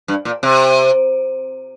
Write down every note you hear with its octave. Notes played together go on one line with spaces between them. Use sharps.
G2
A#2
C3